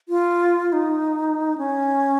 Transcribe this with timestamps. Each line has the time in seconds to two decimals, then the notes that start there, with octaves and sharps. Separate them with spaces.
0.09 F4
0.73 D#4
1.58 C#4